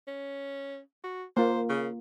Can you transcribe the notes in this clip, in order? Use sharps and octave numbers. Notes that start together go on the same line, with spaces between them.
C#4
F#4
A#3 F4 C5
C#3